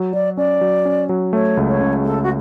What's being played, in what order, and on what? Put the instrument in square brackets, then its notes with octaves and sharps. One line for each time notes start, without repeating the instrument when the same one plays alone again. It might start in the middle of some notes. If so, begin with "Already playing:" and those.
Already playing: [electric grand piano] F#3
[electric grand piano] F#3 [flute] D5
[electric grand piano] C#4 [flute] D5
[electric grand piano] F#3
C#4
F#3
[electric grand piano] A3 [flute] C#5
[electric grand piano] C#2
[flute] C#5
[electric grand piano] C#3
[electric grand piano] A3 [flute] A4
[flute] F#4